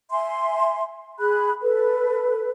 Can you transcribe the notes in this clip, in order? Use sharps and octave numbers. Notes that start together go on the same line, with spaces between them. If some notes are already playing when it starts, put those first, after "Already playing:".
E5 G#5 C6
G#4 B5 F#6
A4 B4